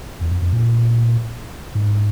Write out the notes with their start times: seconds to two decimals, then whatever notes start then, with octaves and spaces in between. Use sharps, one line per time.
0.21 E2
0.31 F2
0.42 F2
0.52 A#2
1.75 G#2